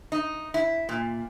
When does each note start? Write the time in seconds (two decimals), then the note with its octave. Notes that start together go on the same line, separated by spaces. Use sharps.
0.12 D#4
0.54 E4
0.89 A#2